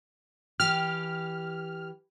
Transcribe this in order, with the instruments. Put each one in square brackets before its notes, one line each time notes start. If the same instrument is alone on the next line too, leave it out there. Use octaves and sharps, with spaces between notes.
[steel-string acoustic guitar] E3 G4 [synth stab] F6